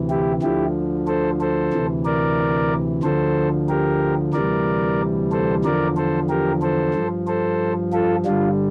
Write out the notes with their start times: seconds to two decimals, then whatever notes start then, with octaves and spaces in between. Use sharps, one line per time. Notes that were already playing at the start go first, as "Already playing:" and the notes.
Already playing: D2 C3 E3
0.10 E4 G4
0.43 D2 D3 F3 E4 G4
1.07 A4 C5
1.41 A4 C5
1.73 D2 C3 E3
2.05 A#4 D5
3.03 D2 D3 F3 A4 C5
3.69 G4 A#4
4.33 D2 C3 E3 G3 A#4 D5
5.32 A4 C5
5.64 E2 D3 F3 A#4 D5
5.97 A4 C5
6.29 G4 A#4
6.62 A4 C5
6.94 G2 F3
7.27 A4 C5
7.93 F4 A4
8.25 G2 D3 G3 D4 F4